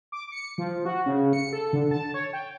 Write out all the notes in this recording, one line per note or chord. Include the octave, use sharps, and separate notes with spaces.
D6
C#7
F3
F#4
C#3
C#7
A4
D3
A5
C#5
G5